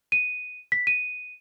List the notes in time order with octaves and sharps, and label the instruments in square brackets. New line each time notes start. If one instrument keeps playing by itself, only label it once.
[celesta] D#7
B6
D#7